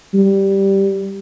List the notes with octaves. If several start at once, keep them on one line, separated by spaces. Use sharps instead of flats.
G3